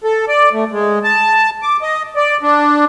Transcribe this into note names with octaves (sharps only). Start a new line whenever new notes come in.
A4
D5
A3
G#3
A5
D6
D#5
D5
D4